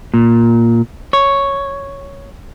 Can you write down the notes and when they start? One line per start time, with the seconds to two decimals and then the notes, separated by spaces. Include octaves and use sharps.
0.14 A#2
1.13 C#5